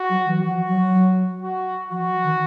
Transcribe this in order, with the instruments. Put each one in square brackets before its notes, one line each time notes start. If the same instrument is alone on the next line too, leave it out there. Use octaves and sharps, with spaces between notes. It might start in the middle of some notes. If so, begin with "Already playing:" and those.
Already playing: [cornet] F#4
[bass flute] F#3
E3
[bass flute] F3 [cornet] F#4
[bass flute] F#3
[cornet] F#4
[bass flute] F3 [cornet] F#4
[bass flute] D#3